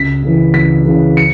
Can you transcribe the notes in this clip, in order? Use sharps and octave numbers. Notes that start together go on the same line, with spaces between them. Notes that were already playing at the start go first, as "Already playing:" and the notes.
Already playing: C#2 B6
C#3 E3
C#2 B6
C#3 E3
C#7